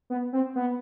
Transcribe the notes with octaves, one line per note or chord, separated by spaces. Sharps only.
B3
C4
B3